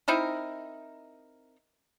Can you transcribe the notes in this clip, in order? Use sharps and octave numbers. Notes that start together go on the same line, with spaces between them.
C4 D#4 E4 A#4